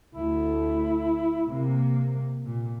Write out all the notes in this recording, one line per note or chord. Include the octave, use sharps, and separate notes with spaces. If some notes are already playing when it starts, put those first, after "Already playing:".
D2 A3 E4
C3 A#3
A#2